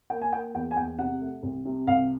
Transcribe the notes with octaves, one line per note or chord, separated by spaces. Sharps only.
A#3 G5
G#5
A#3 G5
E2 G5
G#5
E2 G5
C3 F#5
A3
C2
C3
C2 F5